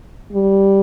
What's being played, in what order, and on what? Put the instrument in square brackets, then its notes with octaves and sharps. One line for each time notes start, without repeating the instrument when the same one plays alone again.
[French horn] G3